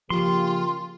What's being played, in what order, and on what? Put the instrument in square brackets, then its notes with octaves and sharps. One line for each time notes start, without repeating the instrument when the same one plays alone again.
[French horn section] C#3 A#3 G4 [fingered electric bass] F3 [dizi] F4 [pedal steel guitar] C6